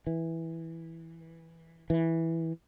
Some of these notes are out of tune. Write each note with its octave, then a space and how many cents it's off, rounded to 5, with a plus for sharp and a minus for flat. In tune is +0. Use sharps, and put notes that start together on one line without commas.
E3 -5
E3 -5